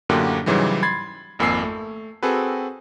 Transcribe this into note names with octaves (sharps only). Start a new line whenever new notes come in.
F#2 A2 D3 A#3 F#4 G4
G#2 C#3 E3 F#3 G3
B5 C6 G#6 A6 C7
G#1 F2 A#3 G#5 E6 C7
A3
C4 F#4 G#4 A4 B4